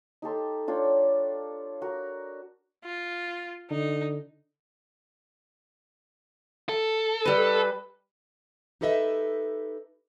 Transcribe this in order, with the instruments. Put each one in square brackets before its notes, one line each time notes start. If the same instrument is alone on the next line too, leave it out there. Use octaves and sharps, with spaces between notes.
[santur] D#4 G4 A4 C6
D4 F4 C#5 G5
F#4 A#4
[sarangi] F4
[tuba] D3 [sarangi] D#4
[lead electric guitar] A4
[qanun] G3 D#5 [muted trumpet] B4
[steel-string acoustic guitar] D#4 G4 A4 B4 D#5 E5